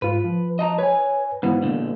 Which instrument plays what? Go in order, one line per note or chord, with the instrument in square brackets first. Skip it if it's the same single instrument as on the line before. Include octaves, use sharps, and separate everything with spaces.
[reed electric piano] G#2 F4 [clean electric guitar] B4
[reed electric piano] F3
[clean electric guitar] D#5 A5 A#5
[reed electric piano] B4 G#5 [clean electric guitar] C#5
[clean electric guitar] G#2 E3 [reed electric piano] B3
[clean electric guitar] A#2 D3